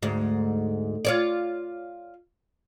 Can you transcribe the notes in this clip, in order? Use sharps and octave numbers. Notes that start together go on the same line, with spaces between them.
D2 G#2
F4 C#5 D5